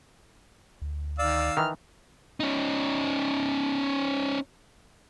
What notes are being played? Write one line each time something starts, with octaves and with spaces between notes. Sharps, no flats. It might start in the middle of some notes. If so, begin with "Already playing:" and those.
D2
D#3 D5 F5 E6
D#3 E3 F6
C#4 D#4